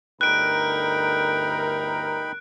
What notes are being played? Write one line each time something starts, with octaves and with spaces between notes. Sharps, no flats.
G1 D2 D#4 A#4 G5 B5 F#6 D7